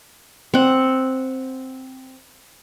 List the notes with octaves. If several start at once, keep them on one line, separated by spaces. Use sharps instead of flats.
C4 F#5